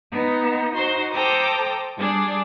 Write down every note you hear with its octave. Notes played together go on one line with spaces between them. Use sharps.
B3 D#4
D#4 F#4 C5 C6
A4 C5 G5 A#5 D6 D#6
G3 D4 G#4 D5